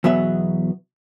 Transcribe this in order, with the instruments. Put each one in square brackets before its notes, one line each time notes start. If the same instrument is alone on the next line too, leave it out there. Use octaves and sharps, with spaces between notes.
[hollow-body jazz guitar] E2 B2 F#3 B3 E5